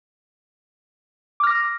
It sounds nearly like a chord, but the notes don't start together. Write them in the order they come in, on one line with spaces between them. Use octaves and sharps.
D6 F6 A#6